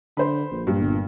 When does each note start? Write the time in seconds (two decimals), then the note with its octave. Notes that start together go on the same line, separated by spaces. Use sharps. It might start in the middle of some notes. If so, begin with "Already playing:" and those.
0.17 D3 C5 B5
0.52 A#1
0.67 G2 A#2
0.81 G1